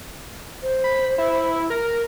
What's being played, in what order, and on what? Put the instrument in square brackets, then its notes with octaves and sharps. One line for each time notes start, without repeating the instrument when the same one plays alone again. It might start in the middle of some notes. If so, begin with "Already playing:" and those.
[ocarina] C5
[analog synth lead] B5
E4
A#4